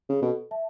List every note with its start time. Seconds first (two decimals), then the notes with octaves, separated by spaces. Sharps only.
0.10 C#3
0.21 B2 A4
0.51 E5 A5